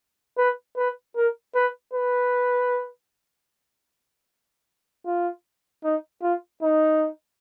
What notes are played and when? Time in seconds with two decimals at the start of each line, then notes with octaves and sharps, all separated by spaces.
0.38 B4
0.77 B4
1.16 A#4
1.55 B4
1.93 B4
5.06 F4
5.84 D#4
6.22 F4
6.62 D#4